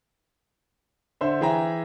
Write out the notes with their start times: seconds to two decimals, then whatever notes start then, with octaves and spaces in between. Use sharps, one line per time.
1.21 D3 C5 E5
1.41 E3 G#4 E5 G5 A#5